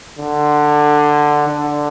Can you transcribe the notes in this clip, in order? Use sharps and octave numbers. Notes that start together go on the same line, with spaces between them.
D3
D3